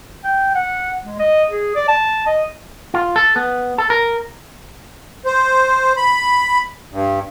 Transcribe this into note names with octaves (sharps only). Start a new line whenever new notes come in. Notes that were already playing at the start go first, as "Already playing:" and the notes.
G5
F#5
G#3
D#5
G#4
D5
A5
D#5
F4
A4
B3
A4
A#4
C5
B5
G2